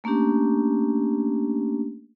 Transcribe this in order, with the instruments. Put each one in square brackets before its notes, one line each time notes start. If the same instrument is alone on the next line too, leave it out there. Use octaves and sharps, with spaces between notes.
[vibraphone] A3 A#3 C#4 D4 G4